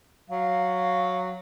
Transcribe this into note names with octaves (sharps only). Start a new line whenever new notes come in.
F#3 F5